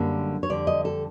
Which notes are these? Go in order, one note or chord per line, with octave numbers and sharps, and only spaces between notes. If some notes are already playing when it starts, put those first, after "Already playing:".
Already playing: F#2 D3 G3 A#3
C#5
F2 D3 G3 D5
D#5
A4